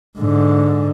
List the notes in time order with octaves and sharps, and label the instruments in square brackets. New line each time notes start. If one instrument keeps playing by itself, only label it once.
[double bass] G#2 D3